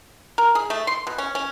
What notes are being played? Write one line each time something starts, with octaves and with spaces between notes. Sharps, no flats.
A#4
G#4
A3
C6
B2
C#4
C#4